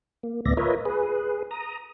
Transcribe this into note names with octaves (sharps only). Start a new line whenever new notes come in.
A#3
D2 A2 B3 D5 E5 A#6
F4 A#4 B4 C#5 D#5 E5
G#4 B4
A#5 D#6